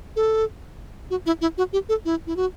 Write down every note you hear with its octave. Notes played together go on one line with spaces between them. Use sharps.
A4
F#4
E4
E4
F#4
G4
A4
E4
E4
F#4